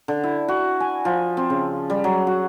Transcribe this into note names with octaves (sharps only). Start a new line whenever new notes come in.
D3
E4
F#4
G#5
F3
C4
C#3
G3
F#3
F#4